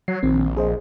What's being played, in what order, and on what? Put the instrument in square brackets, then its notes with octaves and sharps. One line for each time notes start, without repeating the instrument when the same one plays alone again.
[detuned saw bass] F#3 [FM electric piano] C7
[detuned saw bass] A#1 [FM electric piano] D#3 C4
[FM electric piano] G#4 C5 D#5